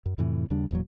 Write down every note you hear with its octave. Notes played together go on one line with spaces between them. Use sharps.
F#2
F2 A2 C3 E3
D#2 C#3 G3 D4
E1 E2 A#2 F#3